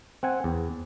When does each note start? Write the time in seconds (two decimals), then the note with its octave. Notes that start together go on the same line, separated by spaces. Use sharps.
0.23 C4 F#5 G#5
0.44 E2